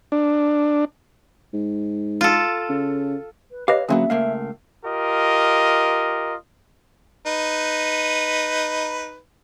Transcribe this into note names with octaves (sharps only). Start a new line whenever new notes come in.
D4
G#2
F4 A4
C#3
B4
G4 B4 C#5 D#5 F5
D3 F#3 A#3 B3 C#4 G#4 E5
C#2 A3 A#3 F5
F4 G4 A#4 D#5
D#4 B4